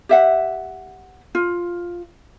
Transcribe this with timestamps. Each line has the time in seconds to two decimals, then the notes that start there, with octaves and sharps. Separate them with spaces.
0.09 G4 E5 F#5
1.35 F4